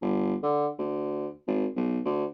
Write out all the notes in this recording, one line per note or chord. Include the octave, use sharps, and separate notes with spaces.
G1
D3
D2
G#1
B1
D2